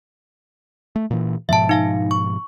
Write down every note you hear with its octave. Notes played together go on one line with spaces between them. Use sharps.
A3
A#2 E3
G#2 B2 F3 E5 A5
D#4 F5 G#5
C#6